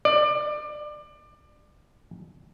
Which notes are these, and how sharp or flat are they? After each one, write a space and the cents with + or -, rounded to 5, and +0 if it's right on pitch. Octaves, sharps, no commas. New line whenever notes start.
D5 +25